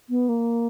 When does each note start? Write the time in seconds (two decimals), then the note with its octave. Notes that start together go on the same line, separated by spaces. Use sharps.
0.10 B3
0.29 A#3